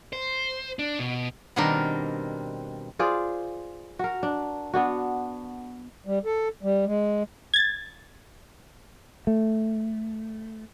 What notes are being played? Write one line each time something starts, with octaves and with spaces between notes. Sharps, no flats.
C5
D4
B2
B2 D#3 G3 C4 D4 A#4
F4 G#4 C5 D5
F#4 A#4
D4
B3 D4 F#4
G3
A4
G3
G#3
G#6 A6
A3